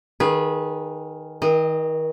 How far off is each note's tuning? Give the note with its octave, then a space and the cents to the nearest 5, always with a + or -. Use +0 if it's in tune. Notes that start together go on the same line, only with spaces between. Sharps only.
D#3 +0 G#4 +0 B4 -25
D#3 +35 D#5 -20